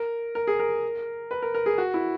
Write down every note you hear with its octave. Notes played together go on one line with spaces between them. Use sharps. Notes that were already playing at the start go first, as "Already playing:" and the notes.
Already playing: A#4
A#4
G#4
A#4
B4
A#4
A#4
G#4
F#4
E4